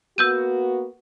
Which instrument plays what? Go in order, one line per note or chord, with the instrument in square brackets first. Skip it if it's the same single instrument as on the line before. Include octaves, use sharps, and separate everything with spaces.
[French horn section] A#3 B3 F#4 [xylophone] E6 G6 D#7